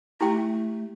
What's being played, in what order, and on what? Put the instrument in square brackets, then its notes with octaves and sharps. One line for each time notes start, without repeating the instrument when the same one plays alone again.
[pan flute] A3 [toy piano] E4 G4 G5